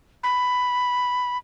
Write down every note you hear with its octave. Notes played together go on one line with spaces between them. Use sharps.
B5